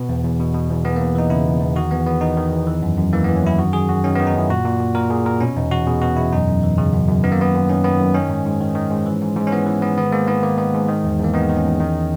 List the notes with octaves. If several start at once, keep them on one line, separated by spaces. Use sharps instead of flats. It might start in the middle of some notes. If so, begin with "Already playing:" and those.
Already playing: B2 B3
E2
E2
B2
B2
E2
E2 B3
E2 A#3
E3 D#4
C#3 E4
E2
E2
D#3 F#4
E2 B3
E2 B3
D#3 D#4
D#3
E2
E3
F#2
F#2
E3 A#3
E3 B3
C#4
F#2 E4
D#3 F#4
F#2 G#4
F#2 F#4
D#3 C#4
D#3 B3
D#4
F#2 E4
A#2 F#4
A#2
A#2
A#2 A#4
A#2 G#4
A#2 A#4
B2 C#4
E2 D#4
E2 F#4
B2 G#4
B2 F#4
E2 E4
F#2 D#4
F#2
E3
C#3
F#2
F#2
D#3 B3
A#3
F#2 B3
F#2
D#3 C#4
D#3 B3
F#2
D#3 C#4
G#2
G#2
D#3
D#3
G#2
E3
G#2
G#2
C#4
E3 B3
E3
G#2 B3
D#3 B3
G#2 A#3
G#2 B3
D#3 A#3
D#3 B3
G#2
D#3
E2
E2
A#3
D#3 B3
D#3
C#4
E2
D#3